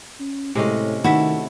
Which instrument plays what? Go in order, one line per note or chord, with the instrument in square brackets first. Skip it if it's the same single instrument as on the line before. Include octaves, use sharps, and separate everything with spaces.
[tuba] C#4
[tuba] A2 [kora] C3 G#3 C#4
[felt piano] D#3 [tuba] A3 [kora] E4 E5 [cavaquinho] F#4 A4